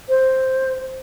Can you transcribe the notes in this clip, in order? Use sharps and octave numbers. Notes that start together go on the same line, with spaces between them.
C5